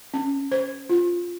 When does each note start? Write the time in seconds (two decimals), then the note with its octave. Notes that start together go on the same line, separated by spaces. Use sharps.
0.14 C#4
0.52 C5
0.89 F4